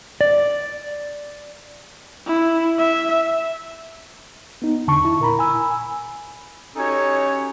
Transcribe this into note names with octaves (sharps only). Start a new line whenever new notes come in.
D5
E4
E5
B3 D#4
E2 D3 A5 C#6
E4
A#2 A#4 A#5 B5
G#5 B5 E6
C#4 D#4 F#4 G4 A4 C#5